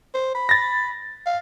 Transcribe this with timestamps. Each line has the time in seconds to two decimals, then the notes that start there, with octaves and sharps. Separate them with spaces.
0.14 C5
0.35 B5
0.49 A6 A#6
1.26 F5